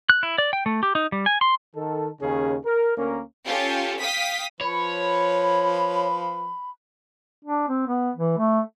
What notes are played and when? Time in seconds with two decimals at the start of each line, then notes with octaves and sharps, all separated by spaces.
0.10 F#6
0.23 E4
0.38 D5
0.53 G5
0.66 A3
0.83 G4
0.95 D#4
1.12 G3
1.26 G#5
1.41 C6
1.76 D#3 A4
2.21 D#2 C#3 C#4 G#4
2.66 A#4
2.98 D2 A#3 C#4 A#4
3.47 C#4 F4 G4 A4
4.01 F5 G5 D#6 B6
4.61 F3 B4 C#5 B5
7.45 D4
7.68 C4
7.87 B3
8.16 E3
8.38 A3